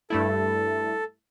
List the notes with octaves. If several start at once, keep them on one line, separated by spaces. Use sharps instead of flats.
G2 A3 E4 A4